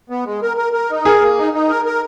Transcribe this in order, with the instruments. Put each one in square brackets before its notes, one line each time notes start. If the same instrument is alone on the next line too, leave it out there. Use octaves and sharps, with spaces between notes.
[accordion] B3
G#3
A#4
A#4
A#4
D#4
[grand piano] G#4 [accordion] A#4
[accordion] A#3
D#4
D#4
A#4
A#4